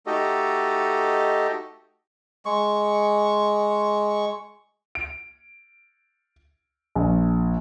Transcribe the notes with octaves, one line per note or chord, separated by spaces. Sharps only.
A3 D#4 F#4 G4 A4 D#5
G#3 C#6
D7
A#1